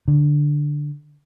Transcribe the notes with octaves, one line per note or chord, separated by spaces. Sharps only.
D3